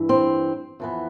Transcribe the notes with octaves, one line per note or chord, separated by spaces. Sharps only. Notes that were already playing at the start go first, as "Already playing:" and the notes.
Already playing: G2 E3
C4
F2 E3 B3